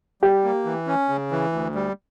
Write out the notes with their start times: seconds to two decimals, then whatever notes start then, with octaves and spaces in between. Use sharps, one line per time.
0.22 G3 G4
0.44 A#3
0.65 E3
0.87 C#4
1.09 C#3
1.31 E3
1.52 D2
1.75 G3